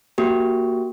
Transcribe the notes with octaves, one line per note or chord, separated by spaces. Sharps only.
A#3 F#4 G4